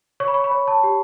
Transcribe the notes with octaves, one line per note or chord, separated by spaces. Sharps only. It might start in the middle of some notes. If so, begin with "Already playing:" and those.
C#5 C#6
B5
C#6
B5
C#5
A5
G4